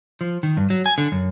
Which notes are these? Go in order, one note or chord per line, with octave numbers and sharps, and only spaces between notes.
F3
D#3
G2
F#3
G#5
D3
F#2